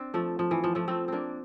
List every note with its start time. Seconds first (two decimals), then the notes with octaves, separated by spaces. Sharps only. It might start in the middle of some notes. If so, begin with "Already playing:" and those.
Already playing: C4 D4
0.14 F3 A3
0.39 F3
0.51 E3
0.64 F3
0.75 F3 A3
0.88 A3 C4
1.08 A#3 C4 D4